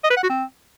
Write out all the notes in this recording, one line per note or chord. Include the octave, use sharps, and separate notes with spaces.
D#5
B4
F#5
F#4
C4